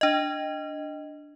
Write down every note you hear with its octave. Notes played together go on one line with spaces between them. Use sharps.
D4 D#5